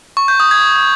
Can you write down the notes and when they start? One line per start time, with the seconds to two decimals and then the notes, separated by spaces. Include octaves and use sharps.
0.17 C#6
0.28 G6
0.40 D#6
0.51 G#6